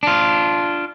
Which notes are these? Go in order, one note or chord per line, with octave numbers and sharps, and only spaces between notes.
D4 F4